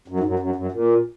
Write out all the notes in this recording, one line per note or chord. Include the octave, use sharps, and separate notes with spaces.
F#2
G#2
F#2
F#2
F#2
A#2